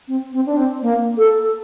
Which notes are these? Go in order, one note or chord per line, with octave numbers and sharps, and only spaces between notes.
C4
C4
D4
C4
A#3
A4